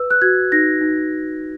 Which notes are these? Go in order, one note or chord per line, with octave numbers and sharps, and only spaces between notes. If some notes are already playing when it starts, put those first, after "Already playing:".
Already playing: B4 E6
F#6
F#4 G#6
D#4 A#6
D#4